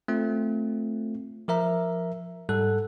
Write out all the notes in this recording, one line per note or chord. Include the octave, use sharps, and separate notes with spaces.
A3 C4 F4
F3 A#4 E5 A#5
G#2 G3 A4 F#6